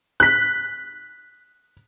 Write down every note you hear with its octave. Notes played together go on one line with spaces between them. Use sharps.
F#6 B6